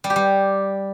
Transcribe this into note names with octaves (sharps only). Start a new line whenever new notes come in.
G3
G4
G3